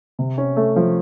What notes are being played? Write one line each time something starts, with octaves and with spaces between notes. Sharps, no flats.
C3
C#4
A3
F3